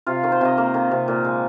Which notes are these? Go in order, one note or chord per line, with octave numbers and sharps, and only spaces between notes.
C3 F4
D#3
C5
C3 D#5
A#3
D#3
C3
A#2
G#3